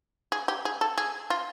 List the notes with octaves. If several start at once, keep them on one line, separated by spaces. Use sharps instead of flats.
G#4
G4
G#4
A4
G#4
F4